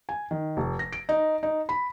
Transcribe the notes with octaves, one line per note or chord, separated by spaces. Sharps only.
G#5
D#3
F1
A#6
D7
D#4
D#4
B5